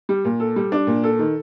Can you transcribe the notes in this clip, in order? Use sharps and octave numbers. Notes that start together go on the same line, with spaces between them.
G3
A#2
A4
G3
D4
A#2
A4
D#3